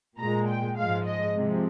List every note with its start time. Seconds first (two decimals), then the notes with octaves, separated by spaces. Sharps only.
0.19 A#2 G#3 A#5
0.48 G5
0.77 G#2 F3 G#3 F5
1.06 D#5
1.35 C3 F3 G#3